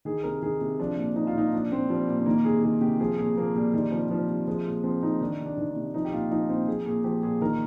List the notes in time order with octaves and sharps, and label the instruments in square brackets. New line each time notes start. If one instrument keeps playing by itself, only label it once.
[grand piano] D#3 G#4
C3 A#4
D#3 G#4
C3
F3 D4
A#2
F3 D#4
F4
A#2 D#4
F3 D4
A#2 C4
F3 G3
A#2
C4
D#3 A#3
C3 G#4
D#3 G#4
C3 G4
F3 G#4
A#2 G#4
F3 A#3
A#2 G3
D#3 G3
C3 F3
D#3 F3
C3
F3 G#3
A#2
F3 C4
A#2 D#4
D#3 D4
C3
D4
D#3
D4
C3
F3 D#4
G4
A#2 F4
F3 D#4
A#2 C4
F3 G#4
A#2 G#4
F3 G4
A#2 G#4
D#3 A#4